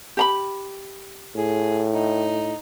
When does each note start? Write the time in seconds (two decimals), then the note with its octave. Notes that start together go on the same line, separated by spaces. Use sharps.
0.17 G4 A#5 B5
1.36 A2 G#4
1.93 D#4